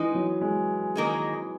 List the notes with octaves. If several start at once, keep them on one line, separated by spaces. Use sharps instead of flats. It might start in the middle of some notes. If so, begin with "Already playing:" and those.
Already playing: E3 G#3 D#4
F#3
G#3
D#3 A#3 D#4 G#4